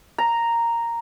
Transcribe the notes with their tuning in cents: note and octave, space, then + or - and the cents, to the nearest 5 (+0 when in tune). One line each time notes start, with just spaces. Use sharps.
A#5 -5